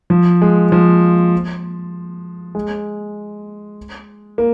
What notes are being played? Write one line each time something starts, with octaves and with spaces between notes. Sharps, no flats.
F3
G#3
F3
G#3
A#3